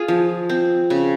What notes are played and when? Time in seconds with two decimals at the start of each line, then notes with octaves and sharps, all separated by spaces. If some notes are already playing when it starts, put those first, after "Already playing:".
Already playing: F4 G#4
0.08 F3
0.49 C4
0.90 C#3